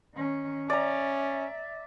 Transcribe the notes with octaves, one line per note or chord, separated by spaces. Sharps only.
D#3 C#4
C#4 D5 E5 A#5